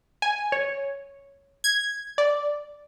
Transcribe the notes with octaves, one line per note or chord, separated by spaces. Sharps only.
G#5
C#5
G#6
D5